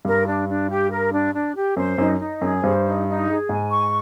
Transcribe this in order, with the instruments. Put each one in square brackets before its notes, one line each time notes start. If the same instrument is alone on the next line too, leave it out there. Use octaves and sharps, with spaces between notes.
[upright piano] G2 [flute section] A#4
[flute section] D4
D4
G4
A#4
D4
D4
G4
[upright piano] F#2 [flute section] C5
[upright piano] F#2 [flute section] D#4
[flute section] D#4
[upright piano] F#2 [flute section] G#4
[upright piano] G2 [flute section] C5
[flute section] D#4
D#4
G#4
[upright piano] G#2 [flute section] G#5
[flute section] C#6